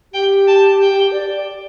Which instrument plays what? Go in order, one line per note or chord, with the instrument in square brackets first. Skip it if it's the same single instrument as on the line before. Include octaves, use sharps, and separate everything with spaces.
[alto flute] G4 [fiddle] G5
[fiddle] A5
G5
[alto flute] D5